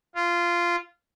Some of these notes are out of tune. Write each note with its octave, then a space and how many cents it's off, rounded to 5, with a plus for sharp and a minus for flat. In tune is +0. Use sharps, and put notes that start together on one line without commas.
F4 -15